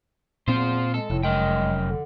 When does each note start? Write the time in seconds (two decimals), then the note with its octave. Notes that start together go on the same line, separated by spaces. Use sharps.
0.48 E2 A#2 C4 F4 C5
0.94 G#3 A4
1.10 F1 A2
1.23 F#2 G#3 A#4 G5
1.88 D3